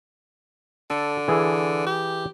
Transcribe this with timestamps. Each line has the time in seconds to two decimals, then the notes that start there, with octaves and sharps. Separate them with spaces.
0.90 D3 A4
1.28 E3 G#4 A4
1.86 G4